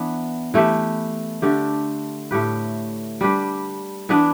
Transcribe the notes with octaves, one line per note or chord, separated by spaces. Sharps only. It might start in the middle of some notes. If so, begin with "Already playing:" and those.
Already playing: E3 B3 D4
E3 A3 G4 B4
D3 A3 D4 G4
A2 A3 G4 B4
G3 D4 G4 B4
E3 B3 D4 B4